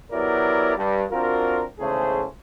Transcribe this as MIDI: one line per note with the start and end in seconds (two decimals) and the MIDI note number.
0.11 0.76 54
0.11 0.76 59
0.11 0.76 64
0.11 0.76 67
0.11 0.76 70
0.11 0.76 74
0.76 1.03 43
1.11 1.63 60
1.11 1.63 62
1.11 1.63 65
1.11 1.63 66
1.11 1.63 70
1.79 2.25 40
1.79 2.25 44
1.79 2.25 49
1.79 2.25 57
1.79 2.25 68
1.79 2.25 72